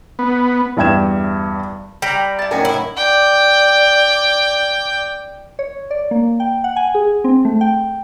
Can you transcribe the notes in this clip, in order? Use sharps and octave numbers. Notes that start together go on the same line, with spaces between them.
B3
E2 G2 E5 G5 G#6 E7
G3 G5 A#5 B5
E4 A5
F#2 A2 D#3 F#4 A#4 G5 G#5
E4
D5 G5
C#5
D5
A#3
G5
F#5
G#5
G#4
C4
A3
G5